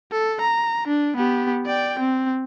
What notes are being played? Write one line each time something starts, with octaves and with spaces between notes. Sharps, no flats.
A4
A#5
D4
B3 G4
D5 G5
C4